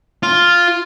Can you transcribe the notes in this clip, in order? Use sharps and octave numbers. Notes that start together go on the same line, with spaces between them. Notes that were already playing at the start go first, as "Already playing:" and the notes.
F4